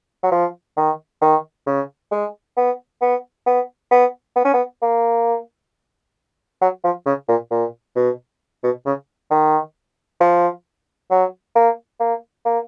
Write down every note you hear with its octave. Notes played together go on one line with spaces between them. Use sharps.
F#3
F3
D#3
D#3
C#3
G#3
B3
B3
B3
B3
B3
C#4
B3
A#3
F#3
F3
C#3
A#2
A#2
B2
B2
C#3
D#3
F3
F#3
A#3
A#3
A#3